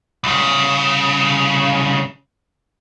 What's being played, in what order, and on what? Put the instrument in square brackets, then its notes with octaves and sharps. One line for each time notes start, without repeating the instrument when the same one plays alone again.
[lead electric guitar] C2 C#3